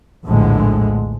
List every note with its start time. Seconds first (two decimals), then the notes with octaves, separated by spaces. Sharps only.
0.25 A#1 E2 A2 D3 G#3